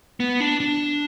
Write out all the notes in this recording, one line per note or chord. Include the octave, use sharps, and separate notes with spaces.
B3
D4
D4